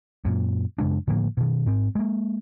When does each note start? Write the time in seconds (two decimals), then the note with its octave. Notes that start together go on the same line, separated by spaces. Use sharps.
0.25 F#2 A#2
0.78 F#2 C#3 G#3 D4
1.07 A2 D3 F3 A#3
1.37 B2 D#3
1.66 G#2 C4
1.95 G#3 A#3